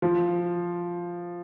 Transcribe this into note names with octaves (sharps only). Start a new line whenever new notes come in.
F3